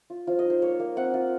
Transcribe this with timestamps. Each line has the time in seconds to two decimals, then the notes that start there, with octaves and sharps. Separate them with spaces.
0.10 F4
0.27 F3 F4
0.39 D#5
0.45 D#4 C5
0.62 A#3 C#5
0.80 A#3
0.96 C4 F#5
1.14 F4